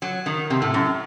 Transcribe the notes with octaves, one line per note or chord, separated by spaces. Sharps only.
F#3
D#3
C3
A2
F#2